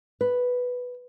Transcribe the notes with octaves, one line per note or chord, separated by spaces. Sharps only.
B4